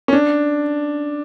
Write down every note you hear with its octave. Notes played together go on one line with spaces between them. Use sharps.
C#4
D4